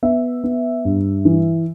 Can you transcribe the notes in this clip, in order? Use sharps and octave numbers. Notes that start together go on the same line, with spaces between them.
B3 E5
B3
G2
E3